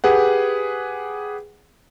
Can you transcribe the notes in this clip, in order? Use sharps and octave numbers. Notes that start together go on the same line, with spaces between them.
G4 G#4 B4 F#5